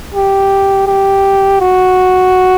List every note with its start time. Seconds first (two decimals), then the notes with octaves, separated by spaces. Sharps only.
0.14 G4
0.87 G4
1.61 F#4